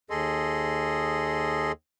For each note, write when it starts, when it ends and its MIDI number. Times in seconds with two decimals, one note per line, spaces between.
0.10 1.72 39
0.10 1.72 68
0.10 1.72 69
0.10 1.72 75
0.10 1.72 84